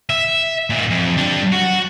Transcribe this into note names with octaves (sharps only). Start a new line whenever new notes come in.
E5
A#2 D#3
F2
G3 D4
F#4